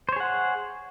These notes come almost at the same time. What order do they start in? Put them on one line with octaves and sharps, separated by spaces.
C5 C#5 G#4 F#5